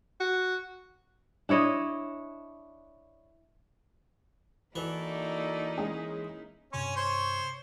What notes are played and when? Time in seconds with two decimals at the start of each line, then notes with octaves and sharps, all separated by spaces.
0.20 F#4
1.49 D4 E4 C#5 D#5
4.76 E3 A#3 D#4 E4 F#4 A4 D5
5.77 G#3 C#4 G#4
6.73 G2 C3 C#4 C#5 C6
6.96 C5 C#5